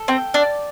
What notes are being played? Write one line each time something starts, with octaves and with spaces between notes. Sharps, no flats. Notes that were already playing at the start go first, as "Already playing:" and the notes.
Already playing: A4
C4 G5
D4 D5